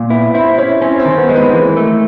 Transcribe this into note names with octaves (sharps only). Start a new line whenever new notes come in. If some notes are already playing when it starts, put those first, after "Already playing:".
Already playing: A#2
B3 E4 B4
C4 E4 C5
C#4 E4 C#5
C4 C#4 C5
C4 C5
D#3
B3 B4
G#3 C5
B3 B4
E3 A#3 A#4
A3